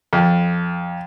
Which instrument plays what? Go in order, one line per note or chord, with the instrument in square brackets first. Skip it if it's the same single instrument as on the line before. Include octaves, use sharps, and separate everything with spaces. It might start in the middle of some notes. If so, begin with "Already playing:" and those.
[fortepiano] F2